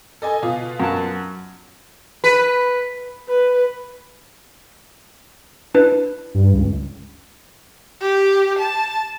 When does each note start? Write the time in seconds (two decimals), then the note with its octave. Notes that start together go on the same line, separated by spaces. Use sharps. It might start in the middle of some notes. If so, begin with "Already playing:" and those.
0.22 A4 D#5 G#5
0.42 B2 F4 D#6
0.79 F#2 A5
2.24 B4
3.29 B4
5.75 D4 E4 B4
6.35 G2
6.54 C#2
8.01 G4
8.59 A5